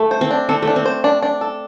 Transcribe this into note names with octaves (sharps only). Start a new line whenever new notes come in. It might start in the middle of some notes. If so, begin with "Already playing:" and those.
Already playing: A3
C5
C4
D4
C4 A4
A3
D4
C4
C5
D4
D4
A4